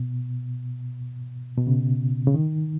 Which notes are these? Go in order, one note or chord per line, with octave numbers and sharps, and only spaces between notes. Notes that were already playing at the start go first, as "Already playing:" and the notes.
Already playing: B2
B2
C#3
C#3
D#3